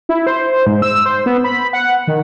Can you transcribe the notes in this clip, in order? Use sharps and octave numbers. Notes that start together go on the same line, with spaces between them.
E4
C5
G#2
E6
C5
B3
B5
F#5
D#3